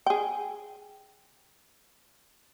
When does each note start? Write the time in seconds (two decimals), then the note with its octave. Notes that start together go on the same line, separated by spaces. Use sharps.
0.06 G#4 G5